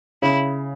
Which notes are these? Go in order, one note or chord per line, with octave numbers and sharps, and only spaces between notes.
C#3 E4